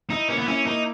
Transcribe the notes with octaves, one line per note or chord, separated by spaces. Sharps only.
D#4 E4
A#3 C#4
B3
C#4 E4
A#3 D#4